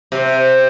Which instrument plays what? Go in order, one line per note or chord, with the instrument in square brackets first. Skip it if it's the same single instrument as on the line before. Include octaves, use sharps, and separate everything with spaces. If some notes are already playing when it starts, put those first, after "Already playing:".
[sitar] C3